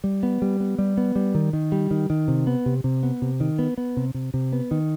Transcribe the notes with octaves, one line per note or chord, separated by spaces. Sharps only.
G3
B3
G3
B3
G3
B3
G3
D#3
D#3
G3
D#3
D#3
C3
B3
C3
C3
B3
C3
D#3
B3
B3
C3
C3
C3
B3
D#3